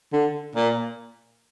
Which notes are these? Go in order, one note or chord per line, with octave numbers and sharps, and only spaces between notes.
D3
A#2